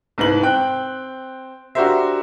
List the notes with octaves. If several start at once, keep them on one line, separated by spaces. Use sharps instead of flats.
C2 G#2 B4 F#7
C4 G5 F#6
D4 F#4 G4 A#4 C5 E5